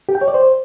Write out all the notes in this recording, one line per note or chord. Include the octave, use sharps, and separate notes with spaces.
G4
G5
C#5
D5
C5